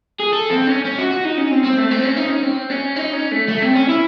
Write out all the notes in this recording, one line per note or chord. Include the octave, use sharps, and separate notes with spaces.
G#4
A4
C4
C#4
C#4
F#4
F#4
D#4
C#4
C4
C4
A3
C4
C#4
D#4
C#4
C4
C#4
D#4
C#4
A3
A3
C4
C#4
E4